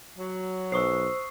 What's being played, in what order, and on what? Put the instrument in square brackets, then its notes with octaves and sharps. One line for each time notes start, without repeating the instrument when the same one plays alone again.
[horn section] F#3
[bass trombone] B1 [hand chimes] C5 E6 [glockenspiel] C#6 D#6 C7